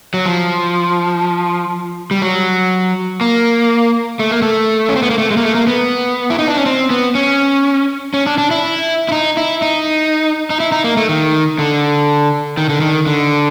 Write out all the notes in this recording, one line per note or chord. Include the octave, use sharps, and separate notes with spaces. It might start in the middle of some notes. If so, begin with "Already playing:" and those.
F#3
F3
G3
F#3
A#3
A3
A#3
A3
C#4
C4
B3
A#3
A3
G#3
A#3
A3
A#3
B3
E4
D#4
D4
C#4
C4
B3
C#4
C#4
D4
D4
E4
E4
D#4
E4
D#4
D#4
E4
D#4
A#3
A3
D#3
D3
D#3
D3
D#3
D3